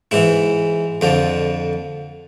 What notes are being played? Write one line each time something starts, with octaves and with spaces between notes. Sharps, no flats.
G#2 E3 E4
F2 D3 F3